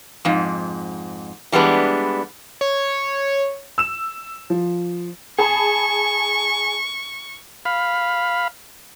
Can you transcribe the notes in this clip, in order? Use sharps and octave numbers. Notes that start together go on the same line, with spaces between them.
F2 G#2
E3 G3 G#3 B3 D4
C#5
E6 E7
F3
G#4 A5 B5 C#6
F5 B5